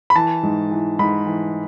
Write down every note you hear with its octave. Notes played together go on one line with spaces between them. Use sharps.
B5
E3 A5
G#2
E3
G#2 B5
E3